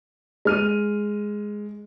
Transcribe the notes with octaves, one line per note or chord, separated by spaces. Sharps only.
G#3 F6 D#7